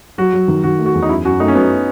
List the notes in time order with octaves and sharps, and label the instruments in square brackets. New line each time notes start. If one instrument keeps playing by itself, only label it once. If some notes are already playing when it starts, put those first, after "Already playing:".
[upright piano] F#3 [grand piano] F#4
[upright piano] F#3
D#3
[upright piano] D#3 [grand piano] F#4
[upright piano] A3
[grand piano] F#4
[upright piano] E2
[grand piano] D#4
[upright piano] F#2 [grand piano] E4
[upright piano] F#2 [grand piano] F#4
[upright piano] A3 [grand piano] D#4
[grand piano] C#4
[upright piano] F#2 [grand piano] B3